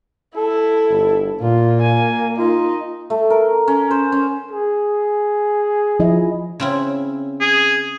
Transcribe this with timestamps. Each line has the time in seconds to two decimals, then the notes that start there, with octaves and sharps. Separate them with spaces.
0.37 E4 A4
0.90 G1
1.41 A#2 A#3 F4
1.82 G#5
2.38 D#4 F4
3.10 A3
3.30 A#4
3.68 C#4
3.91 C5
4.12 C#4
4.51 G#4
6.00 F3 E4 D#5
6.60 C#3 C4 E4
7.41 G#4